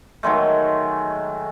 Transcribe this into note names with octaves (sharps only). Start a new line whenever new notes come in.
D#3 F#3 G#3 A3